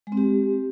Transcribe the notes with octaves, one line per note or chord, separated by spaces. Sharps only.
G#3
C4
G4